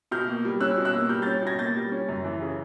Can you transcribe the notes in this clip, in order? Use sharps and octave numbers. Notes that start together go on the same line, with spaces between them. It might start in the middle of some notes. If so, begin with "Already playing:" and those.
B2 F6 G6
A#3
G3
C#4 E6 F#6
B2
E6 F#6
A#3
G3 F6 G6
C#4 G6 A6
B2 G#6 A#6
A#3 G6 A6
G3
C#4
F#2
E3
C#3